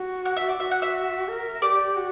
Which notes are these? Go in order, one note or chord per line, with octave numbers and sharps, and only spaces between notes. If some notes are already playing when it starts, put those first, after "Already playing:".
Already playing: F#4
F#5
E5
D5
F#4 E5
F#5
E5
A#4
G4 D5
F#4